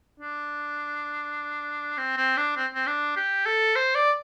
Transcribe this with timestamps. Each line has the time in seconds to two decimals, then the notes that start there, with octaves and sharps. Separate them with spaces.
0.20 D4
1.98 C4
2.17 C4
2.37 D4
2.57 C4
2.75 C4
2.87 D4
3.16 G4
3.46 A4
3.76 C5
3.95 D5